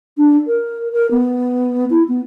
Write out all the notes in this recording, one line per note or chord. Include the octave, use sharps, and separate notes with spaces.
D4
A#4
A#4
B3
E4
B3